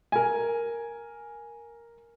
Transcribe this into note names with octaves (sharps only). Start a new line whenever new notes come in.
A#4 G#5